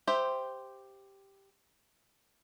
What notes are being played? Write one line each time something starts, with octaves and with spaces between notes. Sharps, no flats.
G4 C5 E5